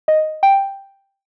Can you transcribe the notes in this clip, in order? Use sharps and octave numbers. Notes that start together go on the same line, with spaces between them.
D#5
G5